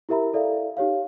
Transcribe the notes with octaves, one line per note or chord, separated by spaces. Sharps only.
E4 G4 A#4 E5 A#5 B5
E4 A4 D5 E5 F5
D#4 G4 C#5 F5